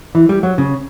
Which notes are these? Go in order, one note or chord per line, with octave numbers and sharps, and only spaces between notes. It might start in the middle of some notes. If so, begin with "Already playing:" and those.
E3
G3
F#3
C#3